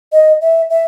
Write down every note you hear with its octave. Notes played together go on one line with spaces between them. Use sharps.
D#5
E5
E5